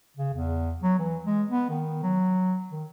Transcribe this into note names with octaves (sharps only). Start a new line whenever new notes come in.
C#3
E2
F#3
E3
G#3
B3
D#3
F#3
D#3